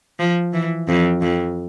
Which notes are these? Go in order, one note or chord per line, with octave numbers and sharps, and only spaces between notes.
F3
E3
F2
F2